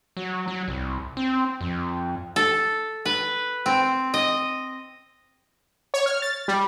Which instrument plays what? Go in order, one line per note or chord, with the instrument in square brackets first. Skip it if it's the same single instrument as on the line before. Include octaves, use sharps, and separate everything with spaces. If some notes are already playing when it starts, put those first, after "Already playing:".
[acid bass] F#3
F#3
C2
C4
F2
[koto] A4
B4
C4
D#5
[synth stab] C#5
F6
A6
G3